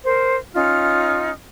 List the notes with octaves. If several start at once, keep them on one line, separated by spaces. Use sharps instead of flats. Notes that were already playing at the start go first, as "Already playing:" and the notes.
A#4 C5
C#4 D#4 F4 F6